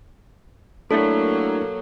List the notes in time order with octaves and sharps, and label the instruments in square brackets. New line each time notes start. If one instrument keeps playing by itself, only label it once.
[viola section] F#3 A#3 [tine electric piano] A3 D4 E4 [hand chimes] A4